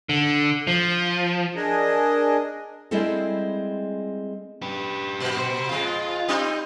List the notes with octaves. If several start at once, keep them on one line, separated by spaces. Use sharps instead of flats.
D3
F3
D4 G#4 A#4 D#5
G3 G#3 C4 E4 G#4 A4
G4 B4
A#2
G4 C5
F2 G#3 F4
G3 C4 D#4